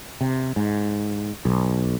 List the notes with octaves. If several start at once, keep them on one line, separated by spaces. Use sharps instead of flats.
C3
G#2
B1